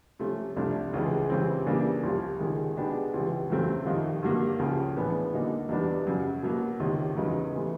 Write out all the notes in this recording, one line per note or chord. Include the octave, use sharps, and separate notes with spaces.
C3 F3 A3 C#4
C2 C3 F3 A3 D4
C#2 C#3 E3 G#3
C#2 C#3 E3 G3 C4
C#3 E3 G3 A#3 D4
C2 C3 F3
C#2 C3 D#3 G#3
B2 G#3 B3 D4 G4
C#2 C3 E3
E2 C#3 F#3 A3 C4
F2 C3 D#3
G2 D3 F#3 A#3
C#2 C#3 F3
A2 E3 G#3 B3 D4
D3 F#3 A#3 D#4
E2 B2 G3 B3 D4
F#2 C#3 F#3
B2 F#3 A#3
C#2 C3 D#3
E2 C#3 F#3 B3 D#4
C3 E3 A3